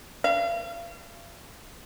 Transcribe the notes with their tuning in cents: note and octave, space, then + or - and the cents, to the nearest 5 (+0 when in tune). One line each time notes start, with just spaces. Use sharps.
F5 -40